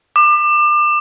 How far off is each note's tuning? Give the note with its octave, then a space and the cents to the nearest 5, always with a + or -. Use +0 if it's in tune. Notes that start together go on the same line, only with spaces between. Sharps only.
D6 +35